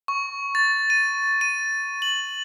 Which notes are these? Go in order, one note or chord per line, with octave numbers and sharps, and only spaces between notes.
C#6
A6
D#7
D#7
F#7